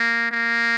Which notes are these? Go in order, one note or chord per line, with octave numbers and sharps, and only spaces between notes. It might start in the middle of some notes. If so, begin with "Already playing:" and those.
Already playing: A#3
A#3